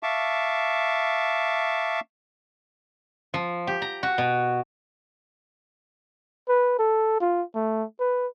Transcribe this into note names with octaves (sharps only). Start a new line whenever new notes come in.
E5 F5 A5 C#6 D6
F3
G4
A#5
F#4
B2
B4
A4
F4
A3
B4